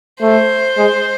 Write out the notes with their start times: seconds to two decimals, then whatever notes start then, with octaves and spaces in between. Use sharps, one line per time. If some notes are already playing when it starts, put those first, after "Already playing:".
0.21 A3 C5
0.78 G#3